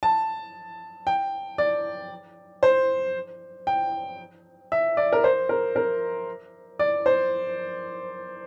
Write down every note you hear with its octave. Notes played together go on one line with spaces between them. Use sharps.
A5
G5
D5
C5
G5
E5
D5
A#4
C5
A#4
A#4
D5
C5